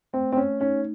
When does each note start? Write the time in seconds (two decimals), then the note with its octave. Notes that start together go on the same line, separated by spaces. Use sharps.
0.13 A3 C4
0.32 C4
0.37 C#4
0.60 C#4 D#4